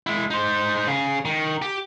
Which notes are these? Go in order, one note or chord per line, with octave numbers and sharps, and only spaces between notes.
G#3 E4
D#4 C5
C#3 G#4
D#3
G4